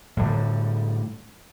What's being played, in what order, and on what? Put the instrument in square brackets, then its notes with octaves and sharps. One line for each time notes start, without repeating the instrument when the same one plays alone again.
[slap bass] A2 D3 G3